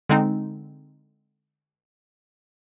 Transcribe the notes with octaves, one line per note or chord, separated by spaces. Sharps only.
D3 G#3 C4 D#4